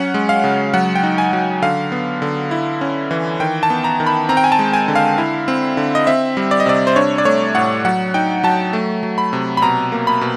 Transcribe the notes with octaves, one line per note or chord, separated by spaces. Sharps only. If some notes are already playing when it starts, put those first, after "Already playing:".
Already playing: F#3 C#4 F#5
G#3
F5
C#3
F#3 F#5
G5
D#4
G#5
F#3
D3 F5
B3
D3
E4
C#4
E3
D#3 G5
A5
B3
A#5
D#3
B5
C4 A#5
G5
G#5
A5
G#3
G#5
D3
F5
E4
C4
D3
D#5
C4 E5
G3
D5
D#5
C3 D5
C5
D4 C#5
D5
A3 C#5
A2 F#5
F#3 F#5
D#4 G5
F#3 A5
A3
F#3
B5
C3
B5
B2 A#5
A#3
B5
B2